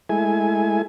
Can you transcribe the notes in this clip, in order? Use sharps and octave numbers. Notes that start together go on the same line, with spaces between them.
G#3 A3 E4 G#5